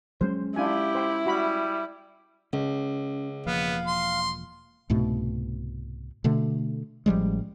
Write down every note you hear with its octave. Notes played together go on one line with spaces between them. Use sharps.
F#3 G#3 C#4 C5
D4 E4 F4 G4 G#5
C5 G5
G3 F#4 B5
C#2 C#4
E1 F3 A#3 B3 F5
C6
C2 G#2 B2 A3
B2 D3 A3
A1 F3 G3 G#3